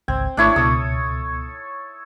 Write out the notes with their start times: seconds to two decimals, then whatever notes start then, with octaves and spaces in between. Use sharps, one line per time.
0.08 G#1 C#2 C4 G#6
0.37 G#1 A3 D4 E4 C#5
0.56 C#2 B2 A4 D#6